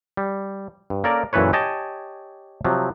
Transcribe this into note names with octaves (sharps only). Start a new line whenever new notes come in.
G3
G2
A#3 C#4 A4 A#4 D5
F#2 A#2 E3 A4 B4 C#5
G4 C#5 D#5 G#5 A5
C3 F3 F#3